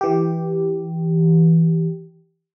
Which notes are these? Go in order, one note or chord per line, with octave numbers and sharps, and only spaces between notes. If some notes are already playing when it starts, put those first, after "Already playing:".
E3 G4